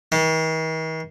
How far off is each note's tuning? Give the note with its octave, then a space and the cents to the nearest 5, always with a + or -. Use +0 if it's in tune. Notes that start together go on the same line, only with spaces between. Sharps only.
D#3 +45